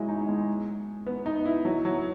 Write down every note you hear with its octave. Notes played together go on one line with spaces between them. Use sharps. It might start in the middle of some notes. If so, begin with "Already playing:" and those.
Already playing: F#3 G#3 E4
D#4
G#3
B3
D#4
E4
F#3
F#3